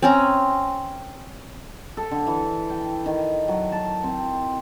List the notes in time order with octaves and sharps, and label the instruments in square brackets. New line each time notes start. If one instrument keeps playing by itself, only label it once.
[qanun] C4 C#4 A#5
[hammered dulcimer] A4
D3
E3
G5
D#3
F#3
A5
C4